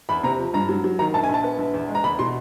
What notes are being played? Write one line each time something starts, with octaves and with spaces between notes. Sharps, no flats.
E2 B5
C3 A#5
F3
G2 A#5
F#3
F#3
D#3 A#5
A#1 A5
G#5
A#1 A5
B3
A#1
E2
G#3
A#5
E2 B5
B2 C6